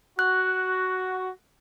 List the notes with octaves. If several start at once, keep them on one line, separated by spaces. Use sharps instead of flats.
F#4 F#6